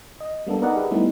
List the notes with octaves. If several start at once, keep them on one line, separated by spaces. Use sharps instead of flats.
D#5
G3 A#3 B3 D4 A4
D#4 A#4 B4 D5 D#5 F#5
G4 G#4 A#4 B4 E5
G3 A3 B3 C#4 D#4 E4